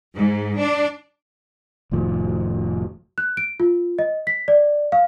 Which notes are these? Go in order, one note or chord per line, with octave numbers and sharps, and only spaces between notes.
G#2
D4
F1 A2 D#3 F3
F#6
D7
F4
D#5
B6
D5
F5